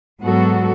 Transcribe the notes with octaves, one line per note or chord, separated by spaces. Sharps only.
G#2 F#3 B3 F#4 A4